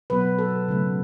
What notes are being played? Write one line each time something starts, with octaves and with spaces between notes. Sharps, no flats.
B2 F#3 B3 B4
A4
C#3 F#3 A3